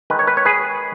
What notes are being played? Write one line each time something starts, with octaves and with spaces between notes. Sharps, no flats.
D#3 G#3 B4
C#5
B4
C#5
G#4 B4